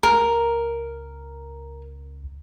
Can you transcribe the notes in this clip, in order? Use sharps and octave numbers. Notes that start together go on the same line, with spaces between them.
C#2 A#4